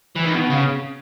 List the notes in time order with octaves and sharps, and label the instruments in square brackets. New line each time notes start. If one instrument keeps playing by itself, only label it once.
[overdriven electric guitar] E3
D#3
B2
C#3